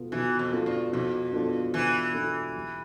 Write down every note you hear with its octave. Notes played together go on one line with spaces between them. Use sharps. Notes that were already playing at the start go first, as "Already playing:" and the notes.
Already playing: B2 B3 F4 A4
B2 E3
F2
B3 F4 A4
G2
F2 B2
B3 D4 F4 A4
B2 E3
B3 D4 F4 A4
G3